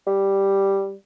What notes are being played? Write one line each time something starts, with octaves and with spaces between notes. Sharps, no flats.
G3